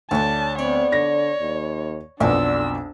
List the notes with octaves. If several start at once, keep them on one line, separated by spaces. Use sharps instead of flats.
D2 C#4 D4 A5
B3 C4 C#5 D5
D3 C#5 A#6
D#2
B1 F2 D3 B3 C4 D4 D5 E6